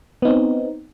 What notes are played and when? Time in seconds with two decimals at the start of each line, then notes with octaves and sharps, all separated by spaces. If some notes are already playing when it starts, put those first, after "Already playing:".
0.22 B3
0.25 D#4
0.28 C4